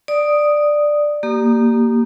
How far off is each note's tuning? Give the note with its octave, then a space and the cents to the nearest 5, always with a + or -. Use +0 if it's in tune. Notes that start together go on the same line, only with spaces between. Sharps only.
D5 +10 D#6 +0
A#3 +0 G4 -15 D#6 -35